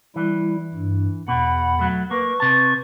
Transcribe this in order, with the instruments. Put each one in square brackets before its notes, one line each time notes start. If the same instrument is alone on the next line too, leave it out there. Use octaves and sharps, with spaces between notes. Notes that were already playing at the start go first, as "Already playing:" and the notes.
[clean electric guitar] E3 [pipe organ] G3 E4
[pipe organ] G2
[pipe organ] E2 F#5 B5 [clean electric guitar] B2
[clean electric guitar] F#3 A3
[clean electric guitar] A#3 [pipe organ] B4 C#6
[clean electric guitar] C3 A5